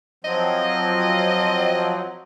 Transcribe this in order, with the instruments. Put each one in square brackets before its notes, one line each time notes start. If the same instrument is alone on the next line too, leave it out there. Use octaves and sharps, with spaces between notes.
[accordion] F3 F#3 C4 [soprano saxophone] D#5